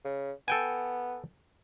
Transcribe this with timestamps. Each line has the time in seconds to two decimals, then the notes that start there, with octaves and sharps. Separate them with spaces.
0.05 C#3
0.48 B3 A4 G5 G#5